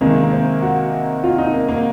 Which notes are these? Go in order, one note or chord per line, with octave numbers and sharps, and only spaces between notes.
C3 D#3 G#3 A#3
A#3
C4
F#4
F4
D#4
A#3
A#3